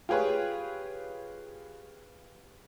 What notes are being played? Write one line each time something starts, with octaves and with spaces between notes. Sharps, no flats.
F4 G4 G#4 B4 C#5